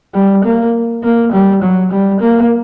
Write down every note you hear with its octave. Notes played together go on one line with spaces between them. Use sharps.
G3
A#3
A#3
G3
F#3
G3
A#3